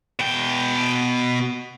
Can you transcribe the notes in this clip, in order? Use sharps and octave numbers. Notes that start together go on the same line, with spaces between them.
B2 G5